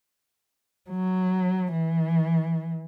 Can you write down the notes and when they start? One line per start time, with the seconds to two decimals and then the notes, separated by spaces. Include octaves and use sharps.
0.90 F#3
1.72 E3